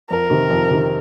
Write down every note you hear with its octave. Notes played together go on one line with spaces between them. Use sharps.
F2 A#4
C3 D#3
F2
C3 D#3